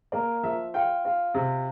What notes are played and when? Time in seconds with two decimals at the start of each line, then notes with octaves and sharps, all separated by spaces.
0.12 A#3 D5
0.43 F3 E5
0.74 F4 G5
1.05 F4
1.34 C3